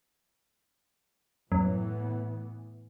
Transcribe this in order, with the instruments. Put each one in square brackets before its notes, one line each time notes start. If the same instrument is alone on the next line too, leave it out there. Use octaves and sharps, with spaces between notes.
[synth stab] F#2 [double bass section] A2 E3 B3